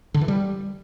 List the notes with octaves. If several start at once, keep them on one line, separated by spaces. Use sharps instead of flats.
D3
E3
G3